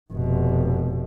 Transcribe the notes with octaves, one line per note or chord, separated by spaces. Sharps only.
F1 B2